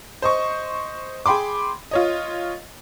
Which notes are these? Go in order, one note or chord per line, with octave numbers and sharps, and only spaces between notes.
C5 D#5 C#6
G#4 G5 B5 C6 D6
F4 C#5 D#5